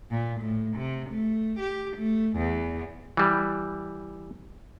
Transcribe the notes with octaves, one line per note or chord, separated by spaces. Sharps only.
A#2
A2
C3
A3
G4
A3
E2
E3 G3